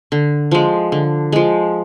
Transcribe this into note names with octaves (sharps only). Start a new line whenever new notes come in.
D3
F3 G#3
D3
F3 G#3